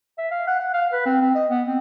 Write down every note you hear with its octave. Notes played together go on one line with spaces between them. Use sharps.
E5
F5
F#5
F#5
F5
B4
C4
C4
D#5
B3
C4